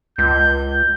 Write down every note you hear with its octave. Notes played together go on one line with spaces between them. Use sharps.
C#2 G6